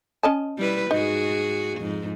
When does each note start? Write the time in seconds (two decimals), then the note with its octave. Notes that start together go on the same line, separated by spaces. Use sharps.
0.23 C#4 D#5 A5
0.58 G3 E4 B4
0.91 G#2 D#4 F#4 G#4
1.79 F2 G#2